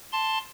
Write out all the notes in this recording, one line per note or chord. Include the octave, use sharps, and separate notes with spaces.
A5 C6